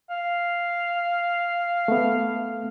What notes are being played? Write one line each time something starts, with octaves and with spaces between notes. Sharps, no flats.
F5
A3 B3